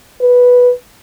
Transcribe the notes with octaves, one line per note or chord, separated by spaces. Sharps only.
B4